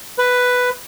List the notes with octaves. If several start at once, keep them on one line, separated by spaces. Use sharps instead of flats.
B4